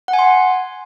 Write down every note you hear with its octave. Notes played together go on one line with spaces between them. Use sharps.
F#5
G#5
C6